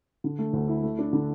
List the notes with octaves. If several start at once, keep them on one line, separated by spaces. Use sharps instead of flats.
D3
A3
D2
E4
A3
D4
D3